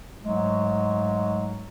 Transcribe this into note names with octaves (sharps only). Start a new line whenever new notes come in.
G#2 F#3 G#3 A3